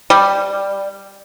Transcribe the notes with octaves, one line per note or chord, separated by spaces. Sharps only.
G3